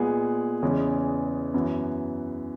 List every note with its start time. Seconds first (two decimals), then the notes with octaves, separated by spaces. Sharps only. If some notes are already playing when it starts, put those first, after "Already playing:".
Already playing: A#2 G#3 B3 G#4
0.62 E2 C#3 E3 G#3 B3
1.54 F#2 E3 B3